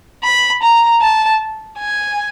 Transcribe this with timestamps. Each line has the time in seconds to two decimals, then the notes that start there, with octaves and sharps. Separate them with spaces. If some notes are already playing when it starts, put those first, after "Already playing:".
0.24 B5
0.62 A#5
1.02 A5
1.79 G#5